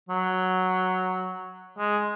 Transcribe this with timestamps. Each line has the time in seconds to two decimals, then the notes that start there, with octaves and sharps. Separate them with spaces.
0.09 F#3
1.78 G#3